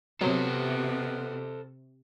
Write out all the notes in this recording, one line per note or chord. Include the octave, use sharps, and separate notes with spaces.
C3 F#3 B3 A4 C5